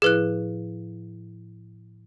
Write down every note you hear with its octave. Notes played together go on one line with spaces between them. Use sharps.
A2 F3 E4 G#4 B4 F#6